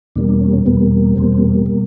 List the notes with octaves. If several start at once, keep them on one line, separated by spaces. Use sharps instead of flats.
E2 B2 G3 A#3 D4
D4
C#4
C#4
E2 B2 G3 A#3 B3
E2 B2 G3 A#3 C4
B2 G3 A#3